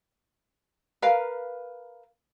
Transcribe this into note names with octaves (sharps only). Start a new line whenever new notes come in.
A#4 B4 F5